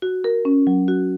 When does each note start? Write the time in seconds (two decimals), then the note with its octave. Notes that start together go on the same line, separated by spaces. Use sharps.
0.02 F#4
0.24 A#4
0.45 C#4
0.67 F#3
0.88 F#4